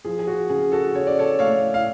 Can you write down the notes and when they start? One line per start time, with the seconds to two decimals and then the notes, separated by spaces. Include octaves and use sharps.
0.05 F3 G#4
0.19 G#4
0.27 F#4
0.50 C#3 G#4
0.72 F#4 A4
0.94 C#3 C#5
1.07 D5
1.19 A4 C#5
1.39 A3 C#5 F5
1.74 F5